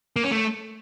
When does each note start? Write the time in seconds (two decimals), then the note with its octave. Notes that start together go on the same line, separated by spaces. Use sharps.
0.16 A#3
0.24 C#4
0.31 A3